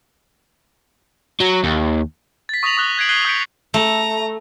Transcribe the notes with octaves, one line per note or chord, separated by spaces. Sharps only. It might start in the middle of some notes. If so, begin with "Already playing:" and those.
F#3
D#2
A6 B6
C#6 D#6 A#6 B6 F7 F#7
C#6 D#6 F#6 G7
F#6 G#6 C7 D7 F#7
F#6 G#6 C7 D#7 G7
D#6 G6 G#6 B6 C#7 D7
A3 A#5